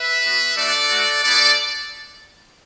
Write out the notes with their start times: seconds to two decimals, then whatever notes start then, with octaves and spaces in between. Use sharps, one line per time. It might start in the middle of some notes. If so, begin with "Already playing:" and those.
Already playing: B4 E5
0.24 B3 F#4
0.56 A3 D4 F#4 A4 D5
0.90 A3 F#4
1.23 B3 E4 A4 D5